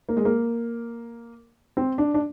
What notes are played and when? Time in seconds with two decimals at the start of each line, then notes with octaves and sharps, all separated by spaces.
0.09 A#3
0.17 G#3
0.25 A#3
1.77 C4
1.98 D4
2.14 D4